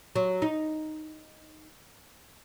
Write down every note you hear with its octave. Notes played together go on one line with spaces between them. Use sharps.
F#3
D#4